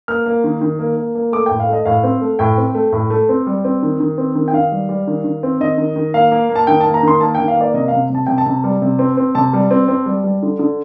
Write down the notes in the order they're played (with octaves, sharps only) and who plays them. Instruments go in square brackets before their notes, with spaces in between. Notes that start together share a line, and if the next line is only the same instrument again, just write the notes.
[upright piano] A#3 F6
A#3
D#3
D#3
A#3
A#3
A#3
A3 D6
A2 G5
F5
A3 D#5
A2 F5
C4
A3
A2 G5
C4
A3
A2
A3
C4
G3
C4
D#3
D#3
C4
D#3
G5
D#3 F5
G3
G3
D#3
D#3
C4
D#3 D#5
D#3
D#3
A#3 F5
A#3
A#3
A5
D#3 G5
A5
A#3
A#5
D#3 C6
A#3 A5
D#3 G5
F5
A#3 D5
C3 D#5
C3 F5
C3 A5
C3 G5
A5
C3
G3
C3
C4
C4
C3 A5
G3
C4
C4
G3
G3
D3
D3